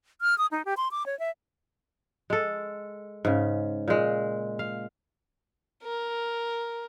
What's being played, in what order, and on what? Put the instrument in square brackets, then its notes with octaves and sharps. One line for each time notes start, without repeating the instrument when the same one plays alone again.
[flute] F6
D#6
D#4
G4
C6
D6
C#5
E5
[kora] G#3 A4
G#2 C#3
A#2 G#3
F5
[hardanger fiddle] A#4